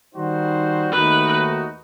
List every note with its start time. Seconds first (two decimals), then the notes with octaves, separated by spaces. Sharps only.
0.13 D#3 G3 D#4 F#4 C5
0.91 D#2 D#3 A3 D#4 F#4 B4